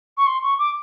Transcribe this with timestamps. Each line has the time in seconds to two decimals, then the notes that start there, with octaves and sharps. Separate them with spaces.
0.17 C#6
0.27 C6
0.43 C#6
0.59 D6